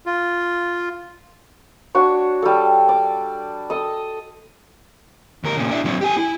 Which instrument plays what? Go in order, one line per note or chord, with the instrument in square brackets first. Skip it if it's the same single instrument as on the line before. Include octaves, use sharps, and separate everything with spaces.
[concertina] F4
[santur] D4 F#4 C#5
G3 A4
D5
A4 D#5
[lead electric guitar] D2 A#4
A#2 C#3
D4 E4
F#3 C4
G4 G#5
E4